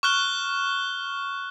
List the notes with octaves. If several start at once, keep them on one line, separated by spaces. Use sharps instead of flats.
C#6 F6 F#6 G7